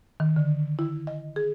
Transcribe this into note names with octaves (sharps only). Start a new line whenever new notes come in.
D#3
D3
E4
D#5
G#4